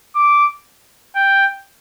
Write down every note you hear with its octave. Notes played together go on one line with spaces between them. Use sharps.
D6
G5